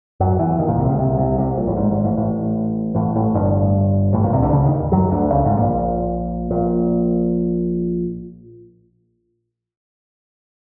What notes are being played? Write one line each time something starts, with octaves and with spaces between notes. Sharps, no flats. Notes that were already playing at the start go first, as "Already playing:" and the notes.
F#2 F#3
E2 E3
D#2 D#3
A#1 A#2
C2 C3
C#2 C#3
C2 C3
C2 C3
C2 C3
A#1 A#2
A1 A2
G#1 G#2
G#1 G#2
A1 A2
A1 A2
A1 A2
A1 A2
G1 G2
A1 A2
A#1 A#2
C2 C3
D2 D3
C#2 C#3
D#2 D#3
F#2 F#3
D2 D3
C#2 C#3
G#1 G#2
A#1 A#2
A#1 A#2